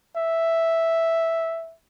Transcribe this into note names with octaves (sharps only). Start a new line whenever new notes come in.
E5